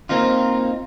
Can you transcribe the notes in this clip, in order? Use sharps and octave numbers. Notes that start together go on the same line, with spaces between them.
A#3 C4 D#4 F4